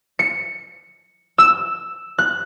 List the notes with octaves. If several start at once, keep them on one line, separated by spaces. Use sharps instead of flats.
C#7
E6
F#6